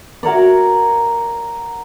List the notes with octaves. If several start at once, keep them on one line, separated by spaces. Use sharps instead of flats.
F#4 A#4 C#5 D5